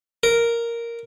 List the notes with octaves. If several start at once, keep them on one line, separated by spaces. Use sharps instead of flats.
A#4